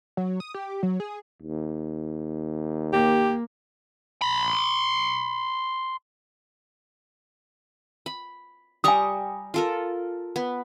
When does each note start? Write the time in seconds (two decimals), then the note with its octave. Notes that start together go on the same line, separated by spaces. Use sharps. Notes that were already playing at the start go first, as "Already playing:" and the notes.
0.17 F#3
0.40 D#6
0.54 G4
0.83 F#3
1.00 G#4
1.43 D#2
2.93 A#3 G4
4.22 B5 C6
8.06 B5
8.84 G3 G#5 A#5 C#6 D#6
9.54 F4 A4 A#4
10.36 B3